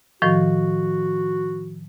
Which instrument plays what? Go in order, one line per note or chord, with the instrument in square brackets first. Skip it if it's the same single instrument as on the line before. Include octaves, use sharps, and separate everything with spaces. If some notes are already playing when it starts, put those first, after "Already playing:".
[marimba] A2 D#3 F3 [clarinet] F#4